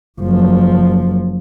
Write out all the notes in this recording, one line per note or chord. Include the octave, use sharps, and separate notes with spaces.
F#1 F3